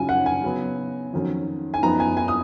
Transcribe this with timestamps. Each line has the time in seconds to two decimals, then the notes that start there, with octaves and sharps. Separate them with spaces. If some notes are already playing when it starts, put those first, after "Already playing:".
Already playing: C#3 F#3 C#4 F4 G#5
0.09 F#5
0.26 G#5
0.43 C#3 F#3 B3
1.13 F2 D#3 F#3 C#4
1.74 G#5
1.82 F#2 F3 B3 D#4 A#5
2.00 G#5
2.17 G#5
2.28 D#6